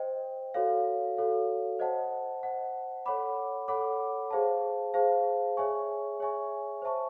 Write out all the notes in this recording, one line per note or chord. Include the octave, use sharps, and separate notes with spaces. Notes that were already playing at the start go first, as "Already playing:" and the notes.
Already playing: C5 D#5 G5
F#4 A4 C#5 F5
F#4 A4 C#5 F5
C5 D#5 F#5 A5
C5 D#5 F#5 A5
A4 C#5 F#5 B5 D6
A4 C#5 F#5 B5 D6
G#4 C5 F5 A5
G#4 C5 F5 A5
G#4 C#5 E5 G#5 C#6
G#4 C#5 E5 G#5 C#6
C5 E5 A5 C#6